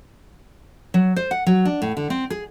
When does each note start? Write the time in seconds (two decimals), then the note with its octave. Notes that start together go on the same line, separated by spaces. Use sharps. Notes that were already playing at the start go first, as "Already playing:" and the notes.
0.94 F#3
1.16 C5
1.31 F#5
1.47 F#3
1.65 D4
1.82 A2
1.97 D3
2.10 C4
2.30 G#4